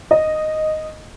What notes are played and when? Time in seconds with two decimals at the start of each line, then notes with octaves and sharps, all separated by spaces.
0.11 D#5